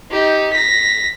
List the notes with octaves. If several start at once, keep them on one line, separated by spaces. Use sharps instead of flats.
D#4 G4
A#6 B6